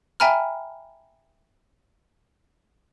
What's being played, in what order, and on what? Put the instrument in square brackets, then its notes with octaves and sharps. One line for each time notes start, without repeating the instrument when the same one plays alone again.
[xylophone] E5 G5 G#5 A#5 B5 F6